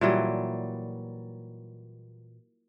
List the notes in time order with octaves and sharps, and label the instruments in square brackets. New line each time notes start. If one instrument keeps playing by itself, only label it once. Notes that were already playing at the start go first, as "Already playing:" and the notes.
[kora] A#2 E3 F#3 G3